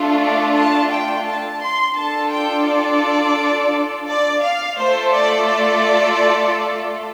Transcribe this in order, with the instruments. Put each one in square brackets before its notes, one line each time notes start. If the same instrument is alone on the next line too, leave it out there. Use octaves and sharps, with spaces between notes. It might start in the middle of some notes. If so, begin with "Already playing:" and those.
Already playing: [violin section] A3 D4 F4
D5
A5
G5
A5
C6
D4 F4 A4 A5
G5
D5
D5
F5
A3 F4 A4 C5
D5
D5